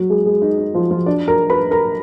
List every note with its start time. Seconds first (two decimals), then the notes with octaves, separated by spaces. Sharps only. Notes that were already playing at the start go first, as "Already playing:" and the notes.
Already playing: F#3 F#4
0.10 G#3 G#4
0.26 G#3 G#4
0.42 D#4
0.58 D#4
0.75 F3 F4
0.91 F3 F4
1.06 D4 D5
1.28 A#4 A#5
1.50 B4 B5
1.71 A#4 A#5